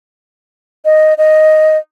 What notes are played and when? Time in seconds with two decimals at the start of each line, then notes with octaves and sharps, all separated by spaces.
0.85 D#5
1.18 D#5